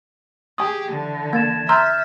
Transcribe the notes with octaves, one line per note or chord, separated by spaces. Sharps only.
G4 G#4 G#5 C#6 D#6
D3 E3
A#3 G#6 A6 E7
E5 A#5 C6 E6 F6 G6 A6